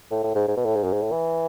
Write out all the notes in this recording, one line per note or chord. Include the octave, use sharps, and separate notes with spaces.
A2
A2
G#2
G#2
B2
A2
G#2
F#2
G#2
A2
E3